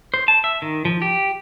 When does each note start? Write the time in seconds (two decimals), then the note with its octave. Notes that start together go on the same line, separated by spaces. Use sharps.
0.14 C5
0.28 A5
0.44 E5
0.62 D#3
0.85 F3
1.02 G4